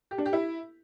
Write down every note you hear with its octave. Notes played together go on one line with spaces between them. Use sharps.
G4
D4
G4
E4